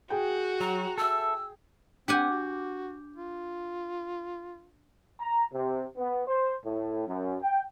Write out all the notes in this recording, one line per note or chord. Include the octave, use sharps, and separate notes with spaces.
F#4 G#4 G5
F#3 A#5
A4 E5 E6
C4 D4 G4 F#5 G#5 D6 G6
F#4
F4
A#5
C3
B3
C5
A2
F#2
G5